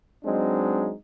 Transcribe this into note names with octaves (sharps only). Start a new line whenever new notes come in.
F#3 G#3 C4 D4 D#4